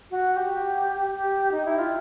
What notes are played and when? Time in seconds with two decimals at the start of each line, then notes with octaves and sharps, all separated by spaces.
0.11 F#4
0.36 G4
1.15 G4
1.51 D#4
1.65 E4
1.78 F4